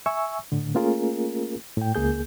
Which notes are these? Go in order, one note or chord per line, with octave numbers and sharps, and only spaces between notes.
E5 G#5 C#6 E6
A2 D3
A3 A#3 C#4 F4 G#4 A#4
A2 G5
C#2 A#3 G#4 G6